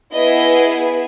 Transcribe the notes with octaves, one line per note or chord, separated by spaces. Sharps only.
B3 E4 G#4 D#5